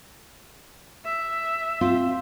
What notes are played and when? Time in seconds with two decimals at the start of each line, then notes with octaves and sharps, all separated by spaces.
1.05 E5
1.81 C4 F4